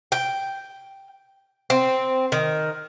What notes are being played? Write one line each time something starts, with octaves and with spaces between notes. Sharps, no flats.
G5
C4
D#3